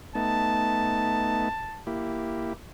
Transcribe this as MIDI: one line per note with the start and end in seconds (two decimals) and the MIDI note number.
0.15 1.49 57
0.15 1.49 59
0.15 1.49 63
0.15 1.84 81
1.87 2.53 58
1.87 2.53 64
1.87 2.53 67